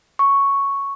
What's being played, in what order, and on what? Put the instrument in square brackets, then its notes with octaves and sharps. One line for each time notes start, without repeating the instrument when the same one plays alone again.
[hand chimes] C#6